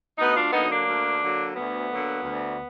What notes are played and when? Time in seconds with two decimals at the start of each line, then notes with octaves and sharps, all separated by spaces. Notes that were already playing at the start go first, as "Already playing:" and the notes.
0.17 D2 B3 D#4
0.35 D4 F4
0.51 D3 F#3 A#3 B3 D#4
0.68 A#3 D4
0.86 D2
1.20 D3 F#3 A#3
1.54 D2 B3
1.89 D3 F#3 A#3
2.22 D2